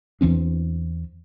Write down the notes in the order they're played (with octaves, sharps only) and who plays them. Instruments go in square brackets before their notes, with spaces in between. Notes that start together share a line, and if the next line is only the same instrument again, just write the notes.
[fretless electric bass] E2 E3 C4 D4